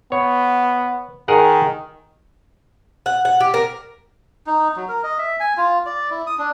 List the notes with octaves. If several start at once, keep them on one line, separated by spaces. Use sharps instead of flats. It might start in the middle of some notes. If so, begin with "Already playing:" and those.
B3 C#5
D#3 G#4 A#4 F#5
F#5
F#5
G4
A#4
D#4
F#3
A#4
D#5
E5
G#5
F4
D5
E4
D#6
D4